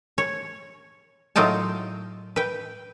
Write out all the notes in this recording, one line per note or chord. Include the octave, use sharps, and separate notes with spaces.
C#5
A2 F#3 D#4 F4 G5 A5
B4 G5